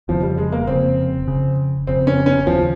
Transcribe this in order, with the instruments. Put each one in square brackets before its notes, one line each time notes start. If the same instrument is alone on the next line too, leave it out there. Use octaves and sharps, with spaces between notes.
[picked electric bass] F1 F2 C#3 [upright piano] F3
[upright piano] G3
G#3
A#3
[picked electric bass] F1 F2 C#3 [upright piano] C4
[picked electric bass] F1 F2 C#3
[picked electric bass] F1 F2 C#3 [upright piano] C4
[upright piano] C#4
C#4
[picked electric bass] D#2 C#3 [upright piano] F3